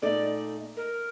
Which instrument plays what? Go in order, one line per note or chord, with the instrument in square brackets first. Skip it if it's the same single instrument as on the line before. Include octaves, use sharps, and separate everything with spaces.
[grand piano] A#2 A3 D#4 [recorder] D5
[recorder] A#4